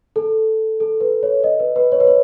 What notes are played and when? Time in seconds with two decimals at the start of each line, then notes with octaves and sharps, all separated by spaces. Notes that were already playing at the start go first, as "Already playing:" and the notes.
0.16 A4
0.80 A4
1.00 B4
1.23 C#5
1.44 D#5
1.60 B4
1.76 B4
1.92 C#5
2.00 B4
2.07 C#5